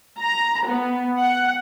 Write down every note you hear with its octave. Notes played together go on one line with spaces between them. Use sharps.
A#5
B3
F#5